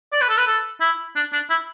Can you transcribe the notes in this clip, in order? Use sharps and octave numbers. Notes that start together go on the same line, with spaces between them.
D5
B4
A4
B4
A4
E4
D4
D4
E4